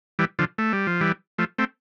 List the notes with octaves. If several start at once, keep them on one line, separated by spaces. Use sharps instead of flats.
E3 G3
D3 F3
A3
G3
F3
E3 G3
F3 A3
A3 C4